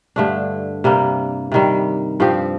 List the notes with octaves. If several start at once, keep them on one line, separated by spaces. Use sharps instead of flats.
G2 D3 A3 D4
C3 G3 A#3
C3 D#3 G3
G2 F3 C4 G4